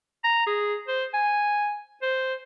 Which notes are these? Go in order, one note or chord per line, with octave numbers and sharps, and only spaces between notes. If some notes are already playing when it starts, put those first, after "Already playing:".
A#5
G#4
C5
G#5
C5